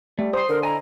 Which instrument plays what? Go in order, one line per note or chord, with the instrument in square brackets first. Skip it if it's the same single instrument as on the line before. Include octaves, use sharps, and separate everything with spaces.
[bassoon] G3 [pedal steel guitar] A3
[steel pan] C5 C6 [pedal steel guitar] D#6
[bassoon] D3 [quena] A#4
[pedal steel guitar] E4 D#5 G#5 [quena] A#5